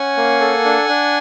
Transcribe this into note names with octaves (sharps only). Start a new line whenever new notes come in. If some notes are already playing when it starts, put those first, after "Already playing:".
Already playing: C#4 F#5 G#5
A#3
A4
D4
D4